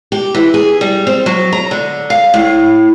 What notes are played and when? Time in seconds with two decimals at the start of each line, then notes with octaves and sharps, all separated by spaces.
0.12 G4
0.35 E3
0.54 G#4
0.81 G3
1.07 C4
1.26 F#3
1.53 A#5
1.71 D3
2.10 F5
2.34 A2